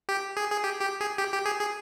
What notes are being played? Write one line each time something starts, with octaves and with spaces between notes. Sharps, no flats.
G4
G#4
G#4
G4
G4
G#4
G4
G4
G#4
G#4